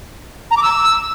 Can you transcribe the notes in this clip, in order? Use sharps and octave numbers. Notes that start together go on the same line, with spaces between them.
A#5
D6
E6